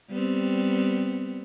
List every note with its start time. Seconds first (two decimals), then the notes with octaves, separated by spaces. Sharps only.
0.11 G3 B3 C4